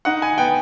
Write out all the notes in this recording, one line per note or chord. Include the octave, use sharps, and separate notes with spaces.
D#4 F#5
G#5
B3 G5